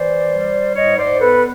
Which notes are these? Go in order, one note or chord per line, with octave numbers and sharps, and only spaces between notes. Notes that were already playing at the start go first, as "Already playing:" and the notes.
Already playing: E3 C5 D5
G3
G#2 C#5 D#5
C5 D5
B3 A4 B4